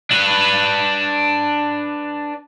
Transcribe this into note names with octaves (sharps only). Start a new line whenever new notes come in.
D4 B4